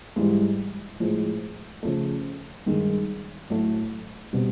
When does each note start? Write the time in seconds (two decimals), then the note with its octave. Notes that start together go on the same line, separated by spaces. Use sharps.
0.16 G#2 E3 G3
1.00 A2 F3 G#3
1.83 C#3 F3 A3
2.66 G2 D#3 G#3
3.50 A2 F#3 A3
4.33 B2 G3 C4